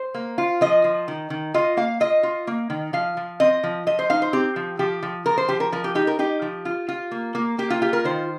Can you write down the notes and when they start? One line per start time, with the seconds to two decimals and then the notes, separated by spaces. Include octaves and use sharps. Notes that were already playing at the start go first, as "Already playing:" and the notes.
Already playing: C5
0.15 A#3
0.38 F4
0.61 F3 D#5
0.84 F3
1.08 D#3
1.30 D#3
1.54 F4 D#5
1.77 A#3 F5
2.00 F4 D#5
2.23 F4
2.47 A#3
2.70 D#3
2.93 F3 F5
3.17 F3
3.40 C4 D#5
3.64 F3
3.87 F3 D#5
3.99 C5
4.10 D#4 F5
4.22 C5
4.33 C4 G4
4.56 F3
4.79 F3 G4
5.03 F3
5.26 F3 A#4
5.38 C5
5.49 F3 G4
5.60 A#4
5.72 F3 A#4
5.84 G4
5.95 D#4 G4
6.07 A#4
6.19 D#4 G4
6.42 F3
6.65 F4
6.88 F4
7.11 A#3
7.35 A#3
7.58 A#3 G4
7.70 F4
7.82 F4 G4
7.93 A#4
8.05 D#3 C5